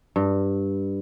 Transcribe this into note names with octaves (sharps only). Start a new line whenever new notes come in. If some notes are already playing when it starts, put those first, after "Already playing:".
G2